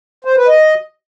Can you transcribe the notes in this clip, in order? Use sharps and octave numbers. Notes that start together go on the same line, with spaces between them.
C5
B4
D#5